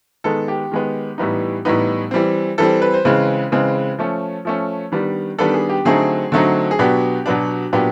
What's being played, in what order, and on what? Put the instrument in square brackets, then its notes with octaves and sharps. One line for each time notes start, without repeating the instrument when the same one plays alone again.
[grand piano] D#3 G#3 B3 A4
G4
D#3 G#3 B3
A2 E3 G3 B3 D#4
A2 E3 G3 B3 D#4
E3 G3 C4
E3 G3 C4 A4
B4
C5
C#3 E3 G#3 C4 B4
C#3 E3 G#3 C4
F3 A3 C#4
F3 A3 C#4
D#3 G3 B3 D4
D#3 G3 B3 D4 A4
G#4
G4
D3 F#3 A3 C4 D#4 G#4
D3 F#3 A3 C4 D#4
G#4
B2 F#3 B3 D4 G4
B2 F#3 B3 D4
A#2 F#3 B3 D4 G4